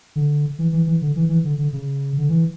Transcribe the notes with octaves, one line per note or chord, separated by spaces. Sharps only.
D3
E3
E3
E3
D3
E3
E3
D3
D3
C#3
D3
E3